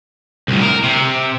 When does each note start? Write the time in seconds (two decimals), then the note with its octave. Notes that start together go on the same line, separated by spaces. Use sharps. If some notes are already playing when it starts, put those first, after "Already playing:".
0.48 C2 A2
0.62 A#4
0.84 C3